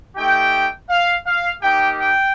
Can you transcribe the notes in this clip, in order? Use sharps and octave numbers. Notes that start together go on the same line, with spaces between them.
A3 D#4 G4 G5
F5
F5
A#3 D#4 G4 G5
G5